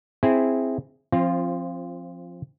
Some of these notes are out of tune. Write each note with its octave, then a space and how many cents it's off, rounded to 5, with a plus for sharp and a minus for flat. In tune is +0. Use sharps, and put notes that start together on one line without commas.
C4 +0 E4 +0 G#4 +0
F3 +0 C4 +25 F4 -15